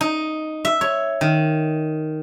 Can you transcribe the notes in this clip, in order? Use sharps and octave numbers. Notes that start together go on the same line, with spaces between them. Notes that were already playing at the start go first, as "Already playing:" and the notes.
D#4
E5
C#5
D#3